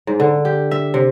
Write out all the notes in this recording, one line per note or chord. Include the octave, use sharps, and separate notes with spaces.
G#2
D3
G4
E5
C3